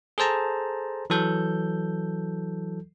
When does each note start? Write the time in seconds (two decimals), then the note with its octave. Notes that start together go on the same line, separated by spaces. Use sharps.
0.18 G#4 A4 C5 A5 A#5
1.10 E3 F#3 A4 G6